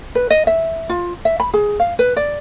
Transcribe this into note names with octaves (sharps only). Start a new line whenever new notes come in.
B4
D#5
E5
F4
E5
B5
G#4
F5
B4
D5